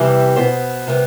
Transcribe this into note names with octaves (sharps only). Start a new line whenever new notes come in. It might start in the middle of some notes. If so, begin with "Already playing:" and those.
Already playing: E2 C3 E3 G3 C4 E5
B2 B3 C5
C3 G3 B3